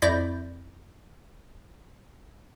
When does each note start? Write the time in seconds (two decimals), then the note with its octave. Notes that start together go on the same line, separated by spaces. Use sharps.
0.02 F2 E4 D5 G6 A#6